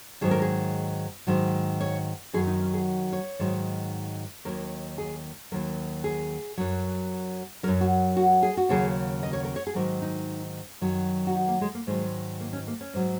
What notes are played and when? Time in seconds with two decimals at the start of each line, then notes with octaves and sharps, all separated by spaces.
0.21 G#2 D#3 F#3 G#4
0.31 A#4
0.42 G#4
1.27 G#2 D#3 F#3
1.80 C#5
2.33 F#2 D#3 F#3 G#4
2.47 D#4
2.59 C#4
2.74 G#4
3.13 C#5
3.39 G#2 D#3 F#3
4.45 D#2 D#3 F#3 A#4
4.98 G#4
5.52 D#2 D#3 F#3 A#4
6.04 G#4
6.57 F#2 F#3
7.63 F#3 A#4
7.68 F#2
7.81 F#4
8.17 F#4
8.43 G#4
8.57 F#4
8.69 D#2 C#3 F#3 G#4
9.23 D#5
9.33 C#5
9.45 A#4
9.56 C#5
9.67 G#4
9.75 G#2 D#3 F#3 A#4
10.02 D#4
10.81 F#2 D#3 F#3
11.27 F#4
11.35 D#4
11.48 A#3
11.61 G#3
11.75 A#3
11.87 G#2 D#3 F#3 G#3
12.40 A#3
12.53 C#4
12.67 A#3
12.81 C#4
12.94 G#2 F#3